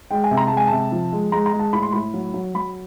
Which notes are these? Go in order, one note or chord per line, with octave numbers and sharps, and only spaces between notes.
G#3 G5
G#5
C3
A#5
G#3 A5
G#5
C3 A5
F3
G#3
G#3 A#5
A#5
G#3
A5
A2 B5
C6
A2 B5
F#3
F#3
F#3 B5